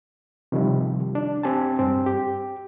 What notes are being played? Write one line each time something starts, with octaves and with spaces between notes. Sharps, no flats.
C3 D#3 F3 G3
D4
C4 G4 G#5 A5
G2 C4
G4